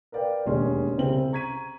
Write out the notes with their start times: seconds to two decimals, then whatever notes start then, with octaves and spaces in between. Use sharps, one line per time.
0.12 A#4 B4 D5 F5 G5
0.46 E1 D#2 G#3 C#4 C6
0.97 C2 C#3 C4 F#7
1.33 A#5 C#6 G#6 B6 D#7